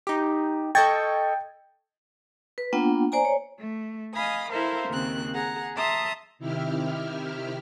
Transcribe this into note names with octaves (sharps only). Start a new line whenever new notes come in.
D#4 G4
A4 D#5 G5 C#6 G#6 A6
B4
A#3 B3 D4 F4 F#5 G5
C5 D5 G#5 A#5
C#5
A3
D#5 F5 G#5 B5 D#6
E4 A4 A#4 C5 E5 F5
D#2 C#3 C4 A#4 F#6
G#4 F#5 A#5
E5 A5 A#5 C6 D#6
C3 D#3 E4 G4 E5 F6